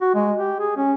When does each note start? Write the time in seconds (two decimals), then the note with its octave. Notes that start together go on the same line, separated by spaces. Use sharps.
0.01 F#4
0.15 G#3
0.37 G4
0.60 G#4
0.77 C#4